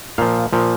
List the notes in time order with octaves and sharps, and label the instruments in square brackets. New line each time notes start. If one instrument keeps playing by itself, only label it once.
[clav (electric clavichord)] A#2 F3 F5
A#2 F3